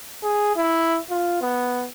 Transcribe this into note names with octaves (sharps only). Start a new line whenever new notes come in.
G#4
E4
F4
B3